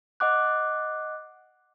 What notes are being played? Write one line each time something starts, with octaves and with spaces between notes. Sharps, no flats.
D#5 F#5 D6 F#6